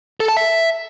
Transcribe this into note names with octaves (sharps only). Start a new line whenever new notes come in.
A4
A5
E5